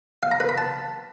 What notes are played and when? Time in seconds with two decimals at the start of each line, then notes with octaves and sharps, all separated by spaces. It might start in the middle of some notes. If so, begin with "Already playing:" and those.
0.23 F5
0.31 A#5
0.40 B4
0.49 B5
0.58 A5